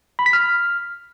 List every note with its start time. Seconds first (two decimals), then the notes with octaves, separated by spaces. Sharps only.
0.19 B5
0.26 B6
0.33 F6